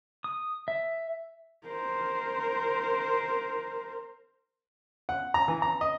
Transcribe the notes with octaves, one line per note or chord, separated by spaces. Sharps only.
D#6
E5
A#4 C5
F#5
A#5
E3
A#5
D#5